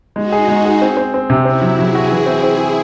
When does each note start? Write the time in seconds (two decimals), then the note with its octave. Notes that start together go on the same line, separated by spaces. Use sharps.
0.16 G#3 D#4 F#4
0.32 G#4
0.48 G#3
0.65 G#4
0.82 C4
0.97 C4
1.14 C4
1.30 C3
1.45 C4 C#4 E4
1.62 F#3
1.78 F#3 E4 G#4
1.95 F#4
2.11 E3
2.26 C4
2.43 C4
2.59 G#4